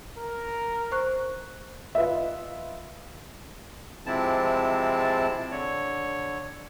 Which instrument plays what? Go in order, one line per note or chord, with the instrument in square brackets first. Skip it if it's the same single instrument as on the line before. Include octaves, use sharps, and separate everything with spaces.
[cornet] A#4
[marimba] C5 C#6 F#6
[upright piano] F4 B4 D#5 E5
[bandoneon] C3 F3 G#3 C4 E4 A5
D3 C#5